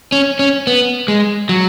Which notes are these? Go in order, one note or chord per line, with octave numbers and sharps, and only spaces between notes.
C#4
C#4
B3
G#3
F#3